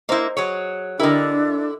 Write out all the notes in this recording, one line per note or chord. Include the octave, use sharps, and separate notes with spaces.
A#3 E4 C5 D#5
F#3 G#4 C#5
D3 D4 E4 G4 A#4 D#5